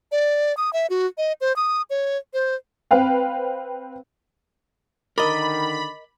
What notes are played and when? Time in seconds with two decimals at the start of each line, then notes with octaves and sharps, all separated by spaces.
0.12 D5
0.57 D#6
0.73 E5
0.90 F#4
1.18 D#5
1.41 C5
1.56 D#6
1.90 C#5
2.34 C5
2.91 C4 B4 F5 G5
5.18 D3 D#3 A#4 D#5 B5 D6 A6